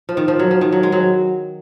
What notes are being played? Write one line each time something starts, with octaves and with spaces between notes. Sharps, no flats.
F3
D#3
F3
F#3
F3
D#3
F#3
G#3
F#3